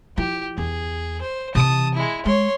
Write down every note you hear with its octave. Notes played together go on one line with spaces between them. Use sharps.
F3 E4 G4
E2 G#4
C5
C3 E3 A5 D#6
G#3 E4
G#3 C#5 C6